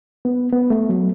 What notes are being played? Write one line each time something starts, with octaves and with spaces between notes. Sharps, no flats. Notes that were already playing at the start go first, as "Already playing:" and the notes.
B3
B3
A3
F#3